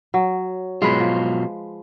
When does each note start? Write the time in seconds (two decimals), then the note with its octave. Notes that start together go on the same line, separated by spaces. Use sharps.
0.14 F#3
0.82 B2 F#3 G#3 F4 B4
1.00 F3